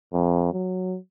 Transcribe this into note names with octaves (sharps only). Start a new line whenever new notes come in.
F2
F#3